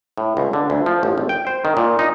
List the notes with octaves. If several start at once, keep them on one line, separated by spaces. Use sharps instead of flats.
A2
C#2
D3
D2
F3
A1
G#1
G5
C5
D#3
A#2
D#4